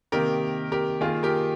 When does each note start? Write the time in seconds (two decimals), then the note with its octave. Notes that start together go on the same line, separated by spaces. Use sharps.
0.12 C3 D#3 A#3 G4 A#4
0.72 G4 A#4
1.01 D#3 A#3 F4 G#4
1.23 G4 A#4